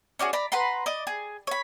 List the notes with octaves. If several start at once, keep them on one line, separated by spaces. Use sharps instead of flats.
C#4 D4 F#4 G#4
D5 A#5 B5
B4 F#5 A#5 C6
D5 D#5
G#4
C#5 B5